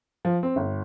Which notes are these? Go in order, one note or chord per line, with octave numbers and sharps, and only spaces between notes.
F3
C4
G1